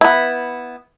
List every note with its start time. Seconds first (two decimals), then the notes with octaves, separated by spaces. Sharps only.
0.01 B3 E4